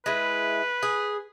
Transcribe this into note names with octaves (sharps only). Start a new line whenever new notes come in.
G#3 E4 B4
G#4